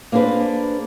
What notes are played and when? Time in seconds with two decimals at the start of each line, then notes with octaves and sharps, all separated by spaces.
0.12 A#3 B3 D4 G#4 B4 C5